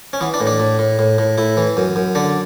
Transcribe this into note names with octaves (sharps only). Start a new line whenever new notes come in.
C#4
E3 B3
D4
A2
D4
A2
A2
A2
A2
A2 E4
E3
F#2
F#2
D3 D4